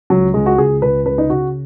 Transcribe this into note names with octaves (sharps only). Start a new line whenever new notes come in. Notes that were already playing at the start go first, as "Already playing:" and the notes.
C#2 F#3
C#2 G#3
F#4
C#2 G#4
C#2 B4
C#3 B4
D#4
C#3 F#4